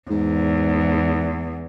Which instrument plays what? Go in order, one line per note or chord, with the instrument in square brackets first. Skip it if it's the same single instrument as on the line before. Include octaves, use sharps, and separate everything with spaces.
[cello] E2 [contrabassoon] G#2